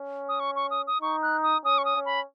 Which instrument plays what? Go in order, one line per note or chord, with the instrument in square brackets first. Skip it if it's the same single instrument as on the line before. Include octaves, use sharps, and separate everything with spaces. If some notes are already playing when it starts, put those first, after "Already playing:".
Already playing: [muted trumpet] C#4
[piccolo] D#6
C#6
C#6
D#6
D#6
[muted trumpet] D#4 [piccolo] C#6
[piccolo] F#6
D#6
[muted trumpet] C#4 [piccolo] D#6
[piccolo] C#6
D#6
[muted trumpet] C#4
[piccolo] B5